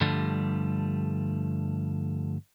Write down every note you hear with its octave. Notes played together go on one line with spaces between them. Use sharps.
G2 D3 F3 G3 A3